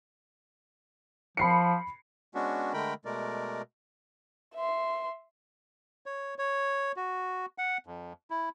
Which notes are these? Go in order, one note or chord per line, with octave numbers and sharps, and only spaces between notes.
F3 B5 C7 C#7
G#3 B3 C#4 D4 F#4
D3 G#3 A3 A#4 G5 B5
B2 G#3 A3 A#4 D5
E5 C6
C#5
C#5
F#4
F#5
F2
E4